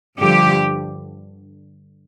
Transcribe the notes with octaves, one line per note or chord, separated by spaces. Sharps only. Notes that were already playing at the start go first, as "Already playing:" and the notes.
G2 D3 F3 G4